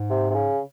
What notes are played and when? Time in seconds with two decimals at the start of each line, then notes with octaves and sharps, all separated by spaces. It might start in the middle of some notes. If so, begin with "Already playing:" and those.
Already playing: G#2
0.10 C3
0.30 C3
0.34 C#3